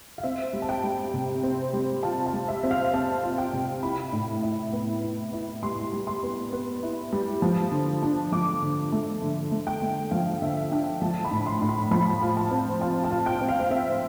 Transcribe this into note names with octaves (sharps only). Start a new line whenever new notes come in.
F5
C4 E5
G3
A5
G5
G3
C3
C4
G3
F4 A5
A5
G3
E5
C4
F5
C4 A5
F4
G5
C3
E4 B5
A2
E4
B3
E4
E4
G3 C6
G3
C6
B3
B3
E4
G3
F3
D3
D4
F3 D6
D3
A3
D3
A3
G5
A3
F3 F5
F5
D3 E5
D4 G5
F3 A5
B5
A2
C6
A2
B5
F3 B5
F4
A5
C4
F4 A5
A5
F4
G5
C4
F5
F5
C4 E5